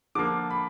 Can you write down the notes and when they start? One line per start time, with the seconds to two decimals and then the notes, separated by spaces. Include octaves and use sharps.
0.15 D3 F3 A#3 D6
0.50 B5